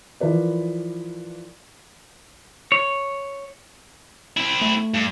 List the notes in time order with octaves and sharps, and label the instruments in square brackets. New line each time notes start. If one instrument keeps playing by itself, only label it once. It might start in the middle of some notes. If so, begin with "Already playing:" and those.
[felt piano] E3 F3 A#4 B4 D5
[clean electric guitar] C#5
[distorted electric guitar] C4 E4
[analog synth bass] A3
[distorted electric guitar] G2